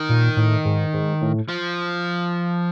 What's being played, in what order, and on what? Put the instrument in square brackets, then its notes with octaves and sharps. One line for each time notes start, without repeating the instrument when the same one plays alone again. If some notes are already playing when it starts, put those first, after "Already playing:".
Already playing: [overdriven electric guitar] D#3
[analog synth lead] A#2
A2
G#2
G#2
A2
[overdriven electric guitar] F3